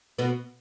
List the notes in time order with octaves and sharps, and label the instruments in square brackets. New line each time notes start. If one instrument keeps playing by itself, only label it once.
[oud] B2 B3